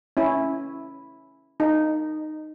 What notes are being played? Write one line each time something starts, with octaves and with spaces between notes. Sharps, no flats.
C#4 E4
D#4